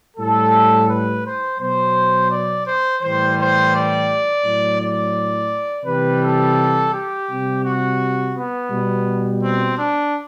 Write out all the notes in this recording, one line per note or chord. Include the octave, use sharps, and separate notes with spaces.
A2 G3 A4
B4
C5
B2 F#3 C5
D5
C5
A2 E3 G3 C5
C5
D5
A2 F#3
D5
C3 E3 G3 B4
A4
G4
C3 G3
F#4
B3
B2 G3
C4
D4